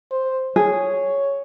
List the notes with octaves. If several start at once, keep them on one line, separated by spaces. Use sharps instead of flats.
C5
G#4 C#5